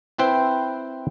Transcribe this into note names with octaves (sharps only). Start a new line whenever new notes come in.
C4 E4 B4 C5 G5